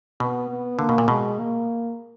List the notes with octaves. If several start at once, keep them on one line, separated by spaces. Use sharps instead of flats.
B2 B3
B3
D3 A#3
B2
A#2
B2 G#3
A#3